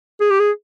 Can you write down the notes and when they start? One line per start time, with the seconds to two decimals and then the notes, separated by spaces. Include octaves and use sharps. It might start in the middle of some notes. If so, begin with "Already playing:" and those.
0.21 G#4
0.30 G4
0.40 G#4